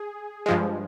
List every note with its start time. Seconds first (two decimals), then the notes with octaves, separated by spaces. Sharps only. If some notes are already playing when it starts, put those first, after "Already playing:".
Already playing: G#4
0.46 G2 F3 G#3